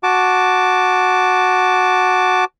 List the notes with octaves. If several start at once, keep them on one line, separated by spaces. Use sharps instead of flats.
F#4 A5 D6